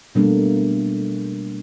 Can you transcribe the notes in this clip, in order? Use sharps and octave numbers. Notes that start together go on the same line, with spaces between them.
B2 G3 A3 A#3 D4